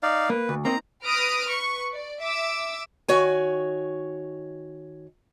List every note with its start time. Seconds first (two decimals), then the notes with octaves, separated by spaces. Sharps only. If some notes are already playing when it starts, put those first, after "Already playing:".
0.03 D#4 D5 F5
0.30 A#3 B4
0.49 D2
0.65 A#3 C4 D#4 A#5
1.03 B4 D#6 F6 A#6 D7
1.47 B4 C#6
1.92 D5
2.23 E5 D6 E6
3.08 D#3 F#4 C#5 G#5